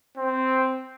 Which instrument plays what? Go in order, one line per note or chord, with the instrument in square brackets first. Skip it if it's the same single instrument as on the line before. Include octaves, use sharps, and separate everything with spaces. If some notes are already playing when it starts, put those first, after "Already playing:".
[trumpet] C4